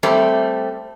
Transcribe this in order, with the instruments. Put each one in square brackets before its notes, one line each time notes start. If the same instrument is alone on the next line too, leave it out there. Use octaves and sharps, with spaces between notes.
[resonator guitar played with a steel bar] G3 A3 C4